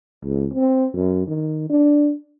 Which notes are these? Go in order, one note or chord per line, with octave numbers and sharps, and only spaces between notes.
C#2
C4
F#2
D#3
D4